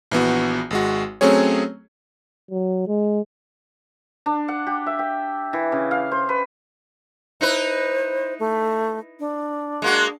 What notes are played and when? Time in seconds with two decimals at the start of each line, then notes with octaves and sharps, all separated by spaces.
0.11 A#1 E3 B3 F#4
0.71 G#1 G#3 F#4
1.21 F#3 A3 C4 C#4 G#4 C#5
2.51 F#3
2.87 G#3
4.26 D4
4.48 F#5
4.67 G4
4.86 E5
4.99 G5
5.53 E3
5.72 C#3
5.91 F5
6.11 C5
6.29 B4
7.41 D#4 E4 B4 C5
8.39 A3
9.19 D4
9.82 G#3 A#3 F#4